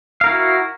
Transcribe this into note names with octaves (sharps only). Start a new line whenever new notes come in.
E4 F#4 A#4 F5